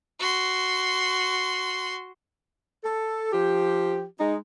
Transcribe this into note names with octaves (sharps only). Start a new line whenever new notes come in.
F#4 C6
A4
F3 G4
G#3 D#4